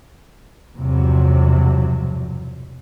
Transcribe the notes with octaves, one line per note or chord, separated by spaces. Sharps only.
B1 E2 G2 C3 F3 F#3